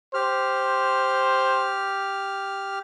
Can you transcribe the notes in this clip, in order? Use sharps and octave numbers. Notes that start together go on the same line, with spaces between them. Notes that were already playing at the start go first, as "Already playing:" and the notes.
G4 C5 F6